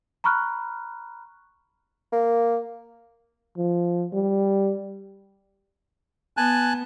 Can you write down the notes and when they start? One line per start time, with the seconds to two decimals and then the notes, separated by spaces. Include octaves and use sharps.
0.24 A#5 B5 C#6 F6 F#6
2.12 A#3
3.57 F3
4.13 G3
6.37 B3 G#5 A5 F#6